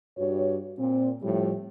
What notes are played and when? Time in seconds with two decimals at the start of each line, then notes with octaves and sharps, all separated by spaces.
0.18 G2 F#4 C#5
0.79 A#2 C4
1.23 A2 F3 G3